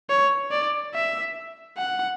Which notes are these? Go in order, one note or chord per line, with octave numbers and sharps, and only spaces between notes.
C#5
D5
E5
F#5